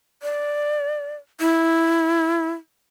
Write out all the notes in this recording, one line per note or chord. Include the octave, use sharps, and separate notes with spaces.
D5
E4